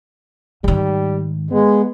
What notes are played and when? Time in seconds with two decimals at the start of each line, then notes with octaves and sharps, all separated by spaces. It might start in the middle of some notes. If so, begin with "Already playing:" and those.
0.64 G#2 D#3 G3
1.51 G#3 B3